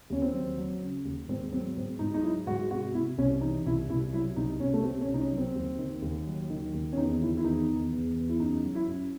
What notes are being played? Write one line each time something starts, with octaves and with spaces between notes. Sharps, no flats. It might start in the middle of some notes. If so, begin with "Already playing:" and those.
D#2 C#4
C4
F#3
F#3
C#3
D#2
G#2 C4
F#3 C4
G#2 C4
G#2 D#4
D#4
F#3 E4
G#2 F#4
C3 F#4
C3 E4
C2 C#4
E3 D#4
C2 E4
C2 E4
F#3 E4
C2 D#4
C2 C#4
A3
C3 C4
C#4
C2
D#4
C#4
F#3
C4
D#2
D#3
D#2
F#3
D#3
D#2
C#4
E2 D#4
D#3 E4
E4
E2 D#4
E2
E2
E2
E4
F#2 D#4
F#3
E4
F#2